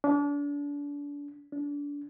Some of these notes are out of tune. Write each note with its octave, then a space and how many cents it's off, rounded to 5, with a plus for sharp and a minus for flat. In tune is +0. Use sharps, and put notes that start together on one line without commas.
D4 -35
D4 -30